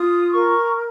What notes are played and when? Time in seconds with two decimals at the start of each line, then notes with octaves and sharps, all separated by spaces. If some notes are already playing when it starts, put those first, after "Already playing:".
Already playing: F4 D#6
0.33 A#4 C#6